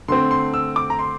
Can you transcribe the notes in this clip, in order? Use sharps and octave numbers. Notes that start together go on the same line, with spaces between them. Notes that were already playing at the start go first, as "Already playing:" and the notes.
D3 A3 C4 C6
C6
E6
D6
A#5
C6